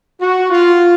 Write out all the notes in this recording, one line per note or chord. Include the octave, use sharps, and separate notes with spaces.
F#4
F4